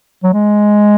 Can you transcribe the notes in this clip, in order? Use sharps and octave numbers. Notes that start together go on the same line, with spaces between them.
F#3
G#3